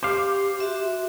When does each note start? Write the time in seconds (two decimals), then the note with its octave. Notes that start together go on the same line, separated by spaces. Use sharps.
0.03 G4 C5 F5 D6
0.58 F#4 E5 C6